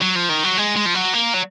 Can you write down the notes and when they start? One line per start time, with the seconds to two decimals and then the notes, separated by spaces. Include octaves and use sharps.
0.01 F#3
0.15 F3
0.29 D#3
0.44 F#3
0.57 G#3
0.76 G#3
0.85 F3
0.94 F#3
1.13 A#3
1.34 F#3